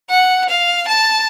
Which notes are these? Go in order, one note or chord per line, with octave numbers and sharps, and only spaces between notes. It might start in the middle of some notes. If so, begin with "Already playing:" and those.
F#5
F5
A5